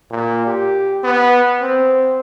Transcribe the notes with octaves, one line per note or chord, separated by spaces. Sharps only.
A#2
G4
B3
C4